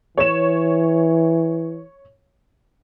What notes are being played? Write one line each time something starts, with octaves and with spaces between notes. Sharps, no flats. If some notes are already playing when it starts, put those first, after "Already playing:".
E3 C#5 E7